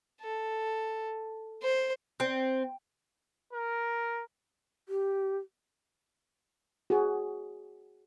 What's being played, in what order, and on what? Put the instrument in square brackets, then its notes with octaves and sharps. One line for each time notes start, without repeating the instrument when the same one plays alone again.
[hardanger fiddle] A4
C5
[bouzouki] C4
[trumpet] A#4
[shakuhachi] G4
[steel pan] F#4 G#4